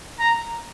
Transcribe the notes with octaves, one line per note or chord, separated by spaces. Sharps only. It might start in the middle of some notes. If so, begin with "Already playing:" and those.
A#5